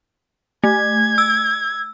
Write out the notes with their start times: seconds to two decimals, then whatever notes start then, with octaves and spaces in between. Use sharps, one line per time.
0.64 A3 G#6
1.18 E6